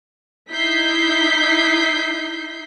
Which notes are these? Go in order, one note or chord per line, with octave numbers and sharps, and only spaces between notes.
D#4 E4 G6 B6 C7